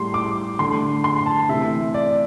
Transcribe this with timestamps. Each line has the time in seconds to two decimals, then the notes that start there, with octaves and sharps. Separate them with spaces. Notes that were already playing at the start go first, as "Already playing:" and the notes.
Already playing: A2 G3 C6
0.14 D6
0.59 D3 A3 C6
1.04 C6
1.26 A5
1.49 C3 E3 A3 E5
1.94 D5